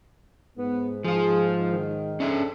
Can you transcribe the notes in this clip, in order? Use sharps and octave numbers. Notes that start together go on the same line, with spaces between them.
G#2 B3
F3 F4 G#4
D#3
C#4 D4 G#4 A4 E5